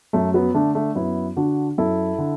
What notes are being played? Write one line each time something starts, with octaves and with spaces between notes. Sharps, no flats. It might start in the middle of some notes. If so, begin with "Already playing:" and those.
F#2 A3
F#3 B3
D3 A3 D4
A3 D4
F#2 B3 E4
D3 D4 F#4
F#2 E4 A4
D3